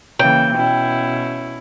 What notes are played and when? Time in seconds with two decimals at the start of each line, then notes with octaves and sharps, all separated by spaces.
0.19 C#3 E3 A#3 G5
0.56 B2 C#4 E4